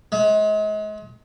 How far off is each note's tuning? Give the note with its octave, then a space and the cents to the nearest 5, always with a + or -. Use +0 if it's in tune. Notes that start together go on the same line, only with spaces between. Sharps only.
G#3 +35